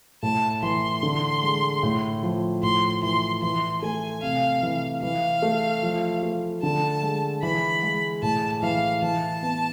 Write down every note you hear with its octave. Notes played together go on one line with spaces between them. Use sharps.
A2 A5
E3 C6
D3
G#3
A2
F3
A2 C6
E3 C6
E3 C6
A3 G#5
C3 F5
E3
E3 F5
A3
F3
A3
D3 A5
G#3
E3 B5
G#3
A2 A5
E3 F5
E3 A5
B3